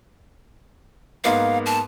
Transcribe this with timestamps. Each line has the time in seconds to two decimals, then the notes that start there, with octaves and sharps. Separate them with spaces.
1.24 G#2 A#3 B3 F5
1.66 A5